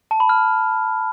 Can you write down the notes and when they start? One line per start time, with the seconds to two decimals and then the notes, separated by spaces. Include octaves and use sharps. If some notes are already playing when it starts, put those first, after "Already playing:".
0.11 A5
0.20 B5
0.29 F6